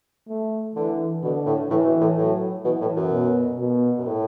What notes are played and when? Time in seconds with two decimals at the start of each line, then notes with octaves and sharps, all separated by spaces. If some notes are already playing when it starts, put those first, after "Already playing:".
0.28 A3
0.75 D3 E3
1.23 B2 D3
1.46 A2
1.70 A2 E3
1.86 B2
2.01 A2
2.18 A2 F#3
2.65 B2 E3
2.81 A2
2.96 F#2
3.11 B2
3.58 B2
3.98 F#2
4.07 A2